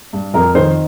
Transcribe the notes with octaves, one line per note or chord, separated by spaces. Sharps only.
G2
F2 A#4
D#3 C5